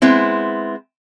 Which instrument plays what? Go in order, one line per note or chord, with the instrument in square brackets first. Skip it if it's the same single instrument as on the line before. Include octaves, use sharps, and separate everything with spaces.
[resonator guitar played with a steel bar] G#3 B3 C4 E4